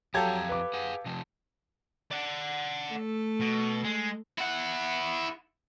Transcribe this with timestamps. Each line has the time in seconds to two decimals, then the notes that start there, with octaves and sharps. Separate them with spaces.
0.14 F2 F#3 G4 A4 F5 A5 A#5 G#6
0.49 B4 D6
0.73 G#4 F#5
1.06 C3 F3 A5
2.11 D5 F#5
2.92 A3 A4
3.40 B2
3.84 G#3
4.38 E4 F#5